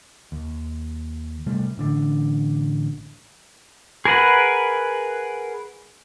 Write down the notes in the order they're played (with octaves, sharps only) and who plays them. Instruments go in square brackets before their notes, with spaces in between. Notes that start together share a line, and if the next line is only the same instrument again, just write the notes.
[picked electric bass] D#2
C3 G3 A3
A1 D3 D4
[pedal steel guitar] G#4 A#4 B4 F#5